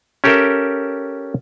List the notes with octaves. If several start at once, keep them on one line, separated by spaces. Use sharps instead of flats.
C#4 G4 A4 A#4 E5 G5